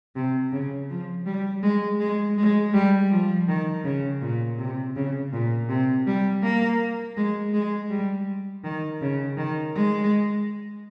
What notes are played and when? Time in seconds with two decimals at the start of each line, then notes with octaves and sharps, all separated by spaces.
0.16 C3
0.53 C#3
0.90 F3
1.26 G3
1.63 G#3
2.00 G#3
2.38 G#3
2.74 G3
3.12 F3
3.48 D#3
3.84 C#3
4.22 A#2
4.59 C3
4.96 C#3
5.33 A#2
5.69 C3
6.07 G3
6.43 A#3
7.17 G#3
7.54 G#3
7.90 G3
8.64 D#3
9.01 C#3
9.38 D#3
9.75 G#3